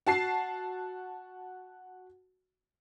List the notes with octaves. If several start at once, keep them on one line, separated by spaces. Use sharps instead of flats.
F#4 A5 C7